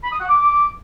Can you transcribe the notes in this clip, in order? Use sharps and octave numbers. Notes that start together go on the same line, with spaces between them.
B5
D#6
F#5
D6